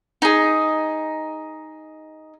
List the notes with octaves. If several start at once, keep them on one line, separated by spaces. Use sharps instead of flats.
D#4 G#4